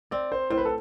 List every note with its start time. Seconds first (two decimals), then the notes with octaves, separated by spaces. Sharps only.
0.11 C4 D5
0.32 C5
0.50 A2 C5
0.57 B4
0.65 A4